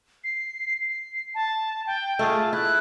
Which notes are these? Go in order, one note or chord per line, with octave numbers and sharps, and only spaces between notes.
C7
C7
A5
G5
A3 F4 G#4 A5
E4 F#6